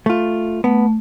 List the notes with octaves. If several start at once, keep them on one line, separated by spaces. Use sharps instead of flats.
A3 F4
A3 B3